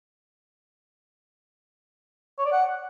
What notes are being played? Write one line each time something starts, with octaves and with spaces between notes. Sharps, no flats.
C#5
D5
F#5